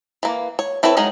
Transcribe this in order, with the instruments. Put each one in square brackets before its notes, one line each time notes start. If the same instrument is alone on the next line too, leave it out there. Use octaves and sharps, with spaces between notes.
[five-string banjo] E3 A#3
C#5
C4 E4 A4 B4 C#5
F#3 G#3 D#4 A#4